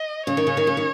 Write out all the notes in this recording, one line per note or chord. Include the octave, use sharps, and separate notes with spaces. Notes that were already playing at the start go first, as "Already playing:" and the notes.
Already playing: D#5
C#3 C#5
D#3
C#3
D#3
C#3
D#3